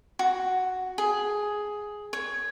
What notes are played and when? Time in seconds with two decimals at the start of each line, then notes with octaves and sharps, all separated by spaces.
0.19 F#4
0.98 G#4
2.13 C#5